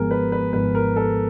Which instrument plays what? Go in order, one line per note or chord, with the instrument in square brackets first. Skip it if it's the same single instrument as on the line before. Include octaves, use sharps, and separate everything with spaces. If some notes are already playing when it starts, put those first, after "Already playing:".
Already playing: [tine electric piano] G#1 G#2 F3 G#3 B3 [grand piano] G#4 A#4
[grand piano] B4
B4
[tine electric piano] G#1 G#2 F3 G#3 B3 [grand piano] B4
[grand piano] A#4
A4